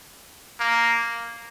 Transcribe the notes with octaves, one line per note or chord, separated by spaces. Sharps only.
A#3